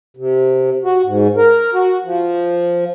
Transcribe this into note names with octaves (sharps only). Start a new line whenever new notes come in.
C3
F#4
G#2
A#4
F#4
F3